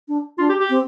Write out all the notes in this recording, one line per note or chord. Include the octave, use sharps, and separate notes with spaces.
D4
D4 F4
G4
G4
C4